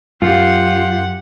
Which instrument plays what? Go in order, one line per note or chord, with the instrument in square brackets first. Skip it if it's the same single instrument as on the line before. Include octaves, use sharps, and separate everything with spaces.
[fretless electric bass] F#2 [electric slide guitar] F4 [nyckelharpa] G4 F#5